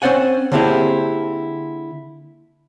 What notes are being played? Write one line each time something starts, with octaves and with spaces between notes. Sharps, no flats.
C4 C#4 C5 D5 F#5 G#5
D3 A#3 C4 E4 G4 G#4